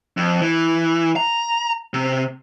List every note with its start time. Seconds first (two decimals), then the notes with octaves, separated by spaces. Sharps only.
0.17 F2
0.41 E3
1.16 A#5
1.94 C3